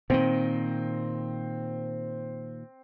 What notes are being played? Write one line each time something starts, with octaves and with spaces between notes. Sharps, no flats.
A#2 D#3 C4